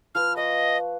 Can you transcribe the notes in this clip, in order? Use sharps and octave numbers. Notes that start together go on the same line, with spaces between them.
F3 B4 G#5 F6
D#5 F5 C#6